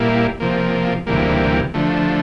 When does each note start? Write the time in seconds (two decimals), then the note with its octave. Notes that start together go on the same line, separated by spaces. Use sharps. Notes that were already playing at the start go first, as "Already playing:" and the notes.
Already playing: A#2 G3 A#3 E4
0.40 C3 F3 A#3
1.07 D2 C3 E3 G3 A#3
1.74 D3 F3 A3